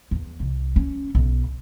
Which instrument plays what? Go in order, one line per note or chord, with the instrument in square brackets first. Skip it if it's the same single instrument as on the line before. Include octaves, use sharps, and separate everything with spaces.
[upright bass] E2
C2
C#4
B1